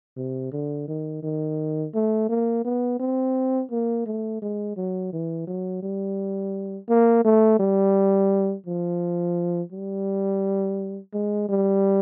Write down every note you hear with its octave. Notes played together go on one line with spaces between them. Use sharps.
C3
D3
D#3
D#3
A3
A#3
B3
C4
A#3
A3
G#3
F#3
E3
F#3
G3
A#3
A3
G3
F3
G3
G#3
G3